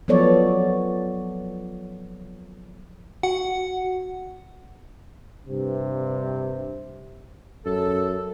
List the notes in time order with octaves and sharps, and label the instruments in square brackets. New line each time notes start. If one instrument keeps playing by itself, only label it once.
[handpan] F3 F#3 B3 A4 C#5 D5
[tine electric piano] F#4 [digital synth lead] F#5
[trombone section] G2 C3
[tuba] F#2 [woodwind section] A4